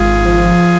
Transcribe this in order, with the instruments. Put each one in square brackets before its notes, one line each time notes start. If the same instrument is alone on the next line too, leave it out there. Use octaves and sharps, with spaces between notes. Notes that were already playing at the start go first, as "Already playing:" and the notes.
Already playing: [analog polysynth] G#1 [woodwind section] F4 G#4
[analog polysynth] F3